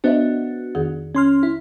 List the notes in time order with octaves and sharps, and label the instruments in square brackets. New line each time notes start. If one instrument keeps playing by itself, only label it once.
[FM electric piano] B3 D4 F#4 [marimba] C5 D#5 E5
[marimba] F2 D#3 G#4
[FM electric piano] C#4 C6 F6
E4